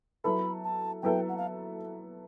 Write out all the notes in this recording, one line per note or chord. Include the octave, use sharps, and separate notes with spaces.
F#3 B3 E4 A4 B5
A5
F#3 B3 E4 A4 G5
F#5
F5